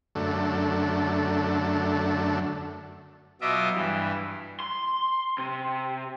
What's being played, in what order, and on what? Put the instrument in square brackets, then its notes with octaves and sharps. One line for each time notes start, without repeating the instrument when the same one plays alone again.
[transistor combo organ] F#2 D3 A3
[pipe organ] B2 F#3 F4 D#5 E5 D6
G2 E3
[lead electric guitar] C6
C3